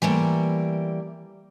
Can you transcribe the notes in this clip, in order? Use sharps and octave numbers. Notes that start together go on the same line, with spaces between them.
E3 G3 A3 A#3